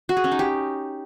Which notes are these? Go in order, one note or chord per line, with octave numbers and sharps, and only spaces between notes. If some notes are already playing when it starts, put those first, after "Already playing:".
F#4
G#4
C#4
D#4
G4